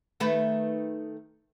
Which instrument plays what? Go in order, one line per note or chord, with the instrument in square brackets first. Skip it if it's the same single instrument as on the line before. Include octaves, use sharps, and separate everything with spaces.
[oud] D#3 A3 B4